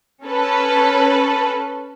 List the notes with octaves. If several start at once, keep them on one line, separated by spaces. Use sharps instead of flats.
C#4 A4 B4